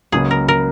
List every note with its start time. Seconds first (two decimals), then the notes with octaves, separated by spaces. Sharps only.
0.12 C#2 C#3 F#3 A#3 G#4
0.31 A#4
0.48 A#4